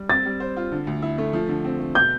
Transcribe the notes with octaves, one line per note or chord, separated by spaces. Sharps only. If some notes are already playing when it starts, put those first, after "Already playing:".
Already playing: G3
C4 A6
G3
C5
F4
D3
D2
E4
A3
F3
D3
C4
A3
B2 G6